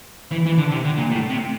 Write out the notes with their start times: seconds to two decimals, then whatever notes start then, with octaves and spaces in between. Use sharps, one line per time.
0.32 E3
0.46 E3
0.58 D3
0.72 C3
0.85 D3
0.98 A#2
1.12 A2
1.30 C3